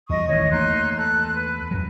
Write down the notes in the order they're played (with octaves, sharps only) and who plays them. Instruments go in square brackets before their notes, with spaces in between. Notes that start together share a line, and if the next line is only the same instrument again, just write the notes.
[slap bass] E2 G3 [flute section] D#5 C#6 D#6
[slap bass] A1 D#3 [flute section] C#5 D#5
[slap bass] E2 A3 A#3 [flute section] D#4 C6 F#6
[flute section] A4 F#6
B4
[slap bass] F#2 F#3